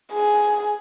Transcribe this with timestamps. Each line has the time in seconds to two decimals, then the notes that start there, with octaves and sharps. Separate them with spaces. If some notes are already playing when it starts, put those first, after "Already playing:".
0.13 G#4